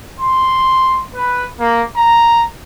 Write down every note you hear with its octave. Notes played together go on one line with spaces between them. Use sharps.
C6
B4
A#3
A#5